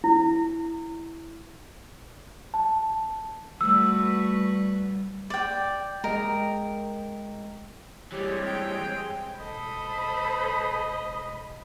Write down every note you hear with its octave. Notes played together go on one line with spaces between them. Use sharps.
E4
A5
G3 A3 F#4 B4 E6
D5 G5
G#3 A#4 D#5 G5
E3 G3 G#3 C4 G4 G#4 C#5
G5
E1 A4 C5 D#5 B5